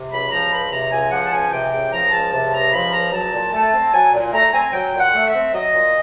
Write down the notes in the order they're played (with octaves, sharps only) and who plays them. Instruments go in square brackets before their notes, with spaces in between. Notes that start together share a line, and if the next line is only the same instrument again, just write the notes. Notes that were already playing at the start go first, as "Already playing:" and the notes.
Already playing: [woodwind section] C3
C#2 B5
F3 A#5
C#2 B5
C3 A#5
C#2 G#5
F3 F#5
A5
C#2 G#5
C3 G5
C#2 G5
F3 A#5
C#2 A5
C3 A5
C#2 A#5
F3 B5
C#2 A#5
F#3 A5
A#2
A3 A5
C4
F#3 G#5
A#2
A3 A#5
C4 G#5
F#3 G5
A#2
F#5
A3
E5
C4
F#3 D#5
A#2